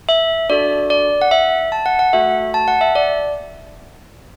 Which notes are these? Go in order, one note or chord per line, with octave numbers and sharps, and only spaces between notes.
E5
D4 F#4 A4 D5
D5
F#5
E5
A5
F#5
F#5
A3 F#4 A4 E5
A5
F#5
E5
D5